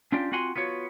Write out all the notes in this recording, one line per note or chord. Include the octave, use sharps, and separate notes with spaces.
C#4 D4 F4 G4 D5 G5
C4 F4 F#4 F#5 G#5 C6
B3 F4 F#4 C#5